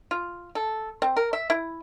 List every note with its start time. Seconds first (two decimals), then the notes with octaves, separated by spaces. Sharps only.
0.11 F4
0.55 A4
1.02 C4
1.17 A#4
1.33 E5
1.50 E4